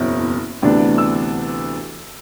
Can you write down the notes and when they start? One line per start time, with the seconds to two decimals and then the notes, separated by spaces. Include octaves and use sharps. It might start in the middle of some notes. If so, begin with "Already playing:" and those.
Already playing: F#1 E2 B2 C4
0.62 D2 C3 E3 B3 D4
0.98 E6